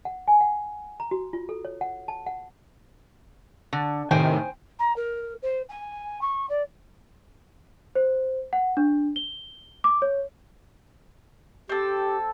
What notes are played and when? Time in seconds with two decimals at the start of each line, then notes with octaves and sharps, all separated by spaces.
0.05 F#5
0.28 G#5
0.41 F#5
1.00 A#5
1.11 F#4
1.33 F4
1.49 A4
1.65 C#5
1.81 F#5
2.08 A5
2.27 F#5
3.73 D3
4.11 A2 C3 D#3 C5 G5 G#5
4.79 A#5
4.96 A#4
5.42 C5
5.69 G#5
6.21 C#6
6.49 D5
7.95 C5
8.53 F#5
8.77 D4
9.16 G7
9.84 D6
10.02 C#5
11.69 C4 G4 A4